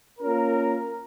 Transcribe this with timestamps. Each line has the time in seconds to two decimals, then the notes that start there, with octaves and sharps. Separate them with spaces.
0.19 A#3 C#4 F4 A#4